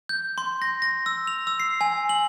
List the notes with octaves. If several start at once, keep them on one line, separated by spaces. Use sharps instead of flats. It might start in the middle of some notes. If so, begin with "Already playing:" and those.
G6
C6
A#6
A#6
E6
F7
E6
C7
G#5
F#7